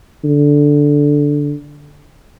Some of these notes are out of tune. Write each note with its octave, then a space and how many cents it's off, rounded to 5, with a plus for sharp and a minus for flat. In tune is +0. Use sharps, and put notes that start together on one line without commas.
D3 -5